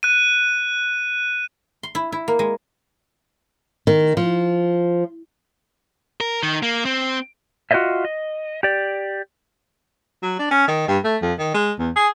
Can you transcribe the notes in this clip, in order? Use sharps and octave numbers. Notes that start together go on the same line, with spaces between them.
F#6 D#7
C6
E4
E4
A#3
G#3
D#3
F3
A#4
D#3
A#3
C4
F4 F#4 C5 C#5 D#5 E5
D#5
G4 D5
F#3
D4
C#4
D#3
G2
A3
F2
D#3
G#3
E2
G#4